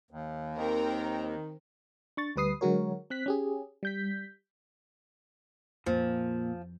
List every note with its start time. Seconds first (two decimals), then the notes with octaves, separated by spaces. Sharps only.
0.11 D#2
0.55 D#3 C4 A#4 G5
2.17 D4 C#6 A6
2.36 D2 G3 B4 D#6 C7
2.61 D3 F#3 G#3 F#4 A#4 C#5
3.10 C4 F#6 B6
3.26 C#4 G4 G#4
3.83 G3 G6 B6
5.86 F2 A#2 F3